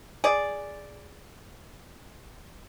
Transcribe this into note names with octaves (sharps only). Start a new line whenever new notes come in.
G#4 D5